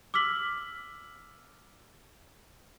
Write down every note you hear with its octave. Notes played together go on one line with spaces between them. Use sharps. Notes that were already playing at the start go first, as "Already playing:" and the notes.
D6 E6 F6 B6 F#7